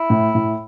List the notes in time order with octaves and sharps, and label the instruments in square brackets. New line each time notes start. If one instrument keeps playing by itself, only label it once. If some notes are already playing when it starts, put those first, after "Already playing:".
Already playing: [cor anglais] E4
[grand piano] A2
A2